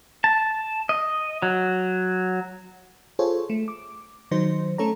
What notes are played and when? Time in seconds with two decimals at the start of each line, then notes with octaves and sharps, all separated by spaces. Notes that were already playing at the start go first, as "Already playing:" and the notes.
0.24 A5
0.89 D#5
1.42 F#3
3.19 F4 G#4 A4 C5 C#5
3.50 A3
3.68 D6
4.31 D#3 F#3 D#4 C5
4.78 A3 C#4 A4 C#5 A#5